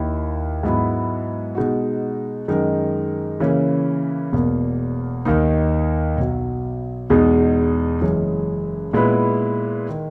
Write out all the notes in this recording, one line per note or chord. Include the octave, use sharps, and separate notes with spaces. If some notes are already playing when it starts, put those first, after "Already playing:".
Already playing: D#2 D#3 A#3 E4
G#2 F#3 B3 E4
B2 G#3 D#4 F#4
F#2 D#3 G#3 D#4 A#4
C#3 E3 A#3 C#4
E1 E2 B2 A#3
D#2 D#3 A#3 D#4
B1 B2 F#3
E2 B2 G#3 D#4 G#4
F#1 F#2 E3 G#3 C#4
A#2 G#3 B3 E4 B4
D#3